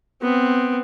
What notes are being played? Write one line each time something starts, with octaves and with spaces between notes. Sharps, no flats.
B3 C4